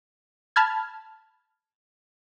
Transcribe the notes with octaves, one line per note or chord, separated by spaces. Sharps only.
A5 B5 F6 G#6